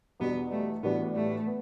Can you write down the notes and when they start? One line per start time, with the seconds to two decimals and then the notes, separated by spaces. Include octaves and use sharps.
0.20 E2 B2 G3 B3 D4 F#4
0.52 A3
0.83 A2 E3 G3 B3 D4 F#4
1.15 A3
1.46 B3